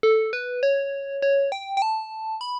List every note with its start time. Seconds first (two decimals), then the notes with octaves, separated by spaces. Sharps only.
0.03 A4
0.33 B4
0.63 C#5
1.22 C#5
1.52 G5
1.77 G5
1.82 A5
2.41 B5